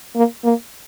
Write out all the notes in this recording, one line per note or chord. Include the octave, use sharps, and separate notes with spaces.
A#3
A#3